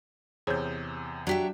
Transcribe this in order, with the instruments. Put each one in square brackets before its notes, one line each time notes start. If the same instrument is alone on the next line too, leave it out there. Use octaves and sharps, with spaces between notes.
[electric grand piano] E2 C3 G6 [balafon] G#4 C5 C#5
[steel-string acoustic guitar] F#3 G4 E5 [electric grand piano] D4 B6